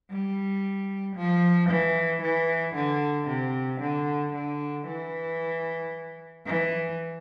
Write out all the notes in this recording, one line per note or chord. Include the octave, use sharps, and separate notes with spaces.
G3
F3
E3
E3
D3
C3
D3
D3
E3
E3